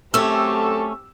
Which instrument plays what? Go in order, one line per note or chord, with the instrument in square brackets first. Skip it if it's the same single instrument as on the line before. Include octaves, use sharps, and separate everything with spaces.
[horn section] F#2 A4 [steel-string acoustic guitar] A3 C#4 [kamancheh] C4 G4 [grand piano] E6